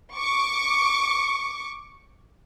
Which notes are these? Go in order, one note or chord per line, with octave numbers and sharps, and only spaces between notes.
C#6 D6